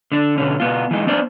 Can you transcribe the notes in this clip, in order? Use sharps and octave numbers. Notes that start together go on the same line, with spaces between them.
D3 D4
B2 D3 C#4
B2 B3 F4
E3 G#3 D#4
B3 D4 C5 D5